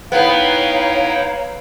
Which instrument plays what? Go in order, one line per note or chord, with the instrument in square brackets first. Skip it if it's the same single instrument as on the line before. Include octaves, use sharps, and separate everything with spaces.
[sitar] B3 [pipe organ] D#4 E4 G5 [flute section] C#5 F5 A#5